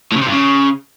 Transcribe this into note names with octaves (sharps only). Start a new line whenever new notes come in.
A2
C#3
C3
G2
C#3